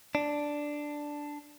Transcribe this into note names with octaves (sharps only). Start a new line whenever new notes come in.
D4